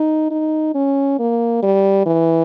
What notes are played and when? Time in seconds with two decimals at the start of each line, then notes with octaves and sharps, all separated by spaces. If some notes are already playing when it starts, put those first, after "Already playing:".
Already playing: D#4
0.31 D#4
0.75 C#4
1.19 A#3
1.63 G3
2.06 E3